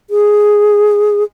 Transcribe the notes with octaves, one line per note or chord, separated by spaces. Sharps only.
G#4